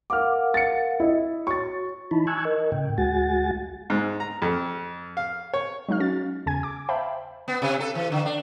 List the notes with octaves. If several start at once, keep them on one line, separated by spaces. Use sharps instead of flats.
A#4 F5 F#5 D6 F6
A6 C#7
E4 D#5
F#4 C#5 C#6 A6
E3 D#4 E4 A5 B5
G#5 A5 C#6 E6 F#6 G#6
A#4 D#5
A2 C#3 G5
D2 G#3 F#4 F#5 G#5 A6
G#2
A#5
F2
F5
C#5
F#3 G#3 D#4 F5 F6
C#4 F#4 A6
E2 C#3 G#5 G#6
D6
C5 E5 F5 G5 A5 B5
B3
C3
A4
E3
D3
D4